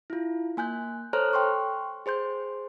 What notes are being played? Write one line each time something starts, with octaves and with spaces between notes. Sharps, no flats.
E4 F4
A#3 G#5 F#6 G6
A4 C5 C#5 A#5 F6 F#6
G5 C6 C#6
G#4 C5 C6 G6